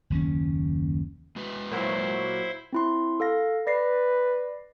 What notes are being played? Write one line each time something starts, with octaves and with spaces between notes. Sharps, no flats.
F#1 D#2 D#3 C#4
G#3 F#4 B4
A#2 F#3 E4 C5
C4 E4 C6
A4 F5 A#6
B4 D5 A#6 C7